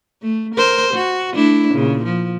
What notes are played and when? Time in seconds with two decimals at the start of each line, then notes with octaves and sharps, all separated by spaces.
0.22 A3
0.55 A#4 C5
0.94 F#4
1.33 A3 D4 E4
1.72 A#2 C#3
2.05 F3